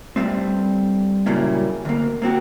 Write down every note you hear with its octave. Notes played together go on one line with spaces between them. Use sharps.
G2 D#3 G3 A3 C4
A#2 C#3 F#3 G3 A#3 E4
D2 A#3
A#3 C4 F#4 G4